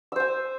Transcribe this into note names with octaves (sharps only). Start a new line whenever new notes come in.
C5 G#5 E6